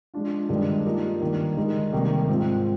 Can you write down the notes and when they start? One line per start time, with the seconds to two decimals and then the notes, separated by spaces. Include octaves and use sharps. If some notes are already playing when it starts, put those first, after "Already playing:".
0.14 F3 G#3 D4 F4
0.49 G2 D#3 G#3 D4 G4
0.85 F3 A#3 D#4 G4
1.21 G2 D#3 A#3
1.57 D#3 G#3 D#4 G4
1.93 C3 D#3 G3 A#3
2.28 G#2 F3 G#3 C4